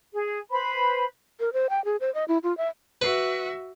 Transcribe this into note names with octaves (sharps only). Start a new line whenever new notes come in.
G#4
B4 C5 B5
A#4
C5
G5
G#4
C5
D#5
E4
F4
E5
F#4 B4 E5